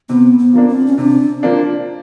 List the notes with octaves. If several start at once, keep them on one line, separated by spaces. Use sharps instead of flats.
C3 B3
B3
F3 A#3 D4
C4
C#4
C3 D4
F3 A#3 D4